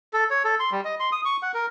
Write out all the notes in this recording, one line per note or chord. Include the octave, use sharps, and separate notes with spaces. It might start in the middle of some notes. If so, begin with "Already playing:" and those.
A4
C#5
A4
C6
G3
D#5
C6
D#6
C#6
F#5
A#4